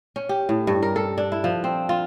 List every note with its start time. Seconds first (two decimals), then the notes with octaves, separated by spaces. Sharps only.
0.16 C#4
0.29 G4
0.49 A2
0.67 G2
0.83 A#4
0.96 A4
1.18 D4
1.32 E4
1.44 F3
1.64 C4
1.89 F4